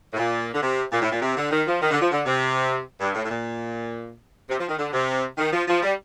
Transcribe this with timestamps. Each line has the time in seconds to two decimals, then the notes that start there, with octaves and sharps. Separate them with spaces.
0.13 A2
0.18 A#2
0.54 D3
0.62 C3
0.92 A#2
1.02 A2
1.12 A#2
1.22 C3
1.37 D3
1.51 D#3
1.67 F3
1.81 D#3
1.91 D3
2.01 F3
2.11 D3
2.26 C3
3.00 G2
3.15 A2
3.25 A2
3.30 A#2
4.49 C3
4.59 F3
4.68 D#3
4.78 D3
4.93 C3
5.38 D#3
5.53 F3
5.68 F3
5.82 G3